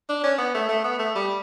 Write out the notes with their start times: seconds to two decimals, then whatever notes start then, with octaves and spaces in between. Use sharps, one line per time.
0.09 D4
0.23 C#4
0.38 B3
0.54 A3
0.69 A3
0.84 B3
0.99 A3
1.15 G3